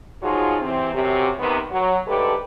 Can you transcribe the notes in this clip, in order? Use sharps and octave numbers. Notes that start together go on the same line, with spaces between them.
F3 F#3 D#4 F4 F#4 G#4
C3 E3 C4
F#2 C3
C3 D#3 B3
F#3
G#2 D3 A3 G4 A4 B4